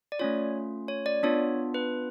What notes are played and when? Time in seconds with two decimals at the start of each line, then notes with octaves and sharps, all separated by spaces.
0.12 D5
0.19 A3 C#4 F4 C#5
0.88 C#5
1.06 D5
1.23 B3 D4 F4 C#5
1.74 B4